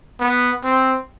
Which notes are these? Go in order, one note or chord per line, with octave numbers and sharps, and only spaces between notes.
B3
C4